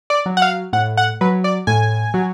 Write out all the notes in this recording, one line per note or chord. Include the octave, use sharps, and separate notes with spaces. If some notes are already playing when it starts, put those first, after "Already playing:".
D5
F#3
F#5
F5
A2 F#5
F#5
F#3 B4
D5
A2 G#5
F#3